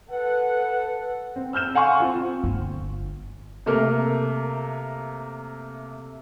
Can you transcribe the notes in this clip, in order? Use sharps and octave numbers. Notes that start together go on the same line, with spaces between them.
A4 B4 F#5
C4
E6 F6 G6 E7
F5 F#5 G#5 C6 C#6
C4 F4
G1
C3 A3 A#3 A#4